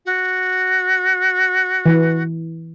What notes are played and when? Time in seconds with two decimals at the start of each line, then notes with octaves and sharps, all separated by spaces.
0.05 F#4
1.86 E3